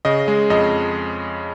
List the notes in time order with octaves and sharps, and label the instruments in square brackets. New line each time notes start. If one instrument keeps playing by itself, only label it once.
[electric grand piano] C#3 D#5
G#3
F2 D#5